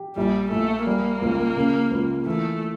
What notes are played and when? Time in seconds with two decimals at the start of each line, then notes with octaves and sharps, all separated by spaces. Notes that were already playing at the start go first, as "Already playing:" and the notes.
Already playing: G4
0.17 A#1 G3
0.51 A#1 A3
0.86 G3 A#3
1.22 C#2
1.56 C#3
1.91 C#2
2.26 E3 A3